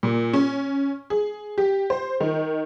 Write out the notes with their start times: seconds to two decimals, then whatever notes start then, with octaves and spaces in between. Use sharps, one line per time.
0.03 A#2
0.33 C#4
1.10 G#4
1.58 G4
1.90 C5
2.20 D#3